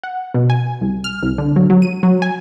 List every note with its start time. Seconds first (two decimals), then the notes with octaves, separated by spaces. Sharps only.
0.04 F#5
0.34 B2
0.50 G#5
0.81 C2
1.04 F6
1.23 C2
1.38 D3
1.56 F#3
1.70 F#3
1.82 D#7
2.03 F#3
2.22 G#5